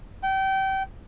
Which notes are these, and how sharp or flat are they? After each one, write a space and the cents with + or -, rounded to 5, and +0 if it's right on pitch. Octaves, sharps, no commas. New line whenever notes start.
G5 -30